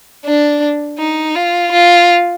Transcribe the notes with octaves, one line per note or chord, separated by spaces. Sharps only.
D4
D#4
F4
F4